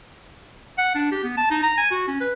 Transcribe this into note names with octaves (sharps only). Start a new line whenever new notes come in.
F#5
D4
G4
B3
A5
D#4
A#5
G#5
F#4
C#4
B4